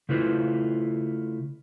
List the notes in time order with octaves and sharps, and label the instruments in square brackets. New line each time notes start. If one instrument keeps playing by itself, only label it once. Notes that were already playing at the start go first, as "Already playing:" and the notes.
[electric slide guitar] C#3 A3 E4 F4 B4 C5